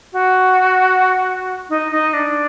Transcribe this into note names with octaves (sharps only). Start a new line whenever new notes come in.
F#4
D#4
D#4
D4